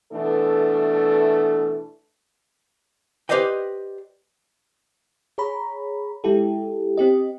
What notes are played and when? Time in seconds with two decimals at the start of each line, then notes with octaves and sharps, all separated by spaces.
0.12 B2 E3 A3 D4 A4
3.29 G4 B4 C5 D5 D#5 G5
5.38 G#4 C#5 A#5 B5
6.24 G#3 E4 G4 A4
6.97 C4 G4 D#5